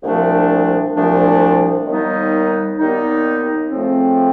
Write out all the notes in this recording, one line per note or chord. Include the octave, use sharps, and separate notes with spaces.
C2 A#2 F3 A3 D4
C2 A#2 F3 A3 D4
D#2 D#3 G3 B3 D#4
D#2 D#3 G3 B3 D#4
F2 C#3 F3 A3 C4